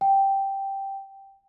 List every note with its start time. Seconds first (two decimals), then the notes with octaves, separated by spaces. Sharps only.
0.01 G5